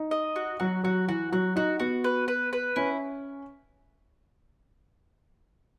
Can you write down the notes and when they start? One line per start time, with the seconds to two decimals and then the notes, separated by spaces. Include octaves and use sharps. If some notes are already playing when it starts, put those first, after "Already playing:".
Already playing: D#4
0.11 D#5
0.36 F#4
0.60 F#3 F#4
0.84 F#3 F#4
1.07 E3 F#4
1.32 F#3 F#4
1.56 D#4 F#4
1.80 B3 F#4
2.04 B4
2.28 B4
2.53 B4
2.76 C#4 E4